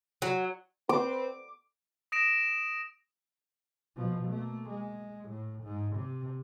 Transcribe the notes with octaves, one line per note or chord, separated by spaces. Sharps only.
F#3
C4 B4 D6
D#6 A#6 D7 E7
B2 F3
A3 A#3
G#3
A2
G#2
C3